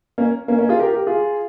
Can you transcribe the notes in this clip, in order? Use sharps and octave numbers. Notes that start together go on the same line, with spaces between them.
A#3 C#4
A#3 C#4
A#3 C#4
F4 G#4
G4 A#4
G4 A#4
F4 G#4